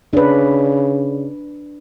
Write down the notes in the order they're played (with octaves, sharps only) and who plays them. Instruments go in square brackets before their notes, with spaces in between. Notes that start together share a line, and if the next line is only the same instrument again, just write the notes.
[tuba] C#3 [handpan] D4 B4